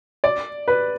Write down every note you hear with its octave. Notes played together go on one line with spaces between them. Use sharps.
D5
B4